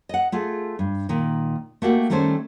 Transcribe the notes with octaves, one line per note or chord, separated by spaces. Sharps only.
D#5 F#5
A3 F4 G#4
G2
A#2 D#3
A3 A#3 D4 F#4 G4
D#3 G3 A3 C#4 A4 C5